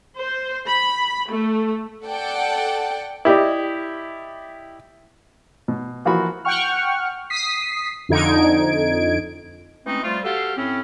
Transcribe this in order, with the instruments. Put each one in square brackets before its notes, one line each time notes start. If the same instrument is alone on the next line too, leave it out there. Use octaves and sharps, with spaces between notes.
[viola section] C5
B5
A3
[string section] A4 D5 F#5 G5
[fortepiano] E4 G4 D5 D#5
B2
E3 F3 A#3 F#4 B5
[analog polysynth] F#5 G5 C#6 F6
D#6 B6 C7
F2 D3 D#4 G#6 D7
[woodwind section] E3 G#3 A3 C4 C#4 D#4
F3 G3 A3 F4
F#4 G4 A4 F5
A2 C4 C#4